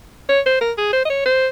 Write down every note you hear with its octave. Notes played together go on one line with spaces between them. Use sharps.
C#5
C5
A#4
G#4
C5
D#5
C#5
C5